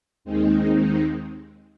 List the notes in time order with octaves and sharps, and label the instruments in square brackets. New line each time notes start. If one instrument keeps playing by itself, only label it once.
[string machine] D#2 D#3 G#3 C4 D#4